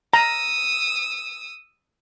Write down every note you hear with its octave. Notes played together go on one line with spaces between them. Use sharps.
A#5 D#6 E6